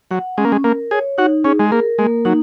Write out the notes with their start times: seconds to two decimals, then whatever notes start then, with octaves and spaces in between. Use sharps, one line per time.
0.11 F#3 F#5
0.37 G#3 C#4
0.45 A#3
0.52 G#3
0.64 A#3 A#4
0.91 G#4 C#5
1.18 D#4 F#4
1.44 C#4 G#4
1.60 G#3
1.72 A#3 A#4
1.98 G#3 A#3
2.25 F#3 D#4